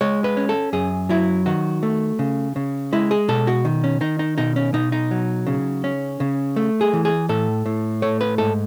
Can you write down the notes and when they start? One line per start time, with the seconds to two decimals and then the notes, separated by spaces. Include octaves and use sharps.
0.01 G#3 C#5
0.24 B4
0.37 C#4
0.49 A4
0.73 F#2 G#4
1.09 F#3 E4
1.46 D#3 F#4
1.83 A3
2.19 C#3
2.56 C#3
2.93 G#3 E4
3.11 G#4
3.28 B2 A4
3.47 F#4
3.65 D#3
3.84 C#4
4.01 D#3 D#4
4.19 D#4
4.38 B2 D#4
4.56 C#4
4.74 B2 D#4
4.92 D#4
5.11 F#3
5.47 C#3
5.84 C#4
6.20 C#3
6.56 A3
6.81 G#4
6.93 E3
7.05 G#4
7.29 A2 A4
7.66 A2
8.02 A3 C#5
8.21 B4
8.38 G#2 A4